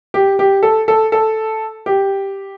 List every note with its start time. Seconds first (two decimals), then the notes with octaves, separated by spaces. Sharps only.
0.14 G4
0.39 G4
0.63 A4
0.88 A4
1.12 A4
1.86 G4